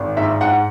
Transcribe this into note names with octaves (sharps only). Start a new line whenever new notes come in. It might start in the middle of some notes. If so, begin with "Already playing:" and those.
Already playing: G#1
G#2 E5
G#2 F#5